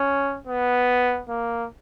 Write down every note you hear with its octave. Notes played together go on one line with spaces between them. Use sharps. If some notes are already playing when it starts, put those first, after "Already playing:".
Already playing: C#4
B3
A#3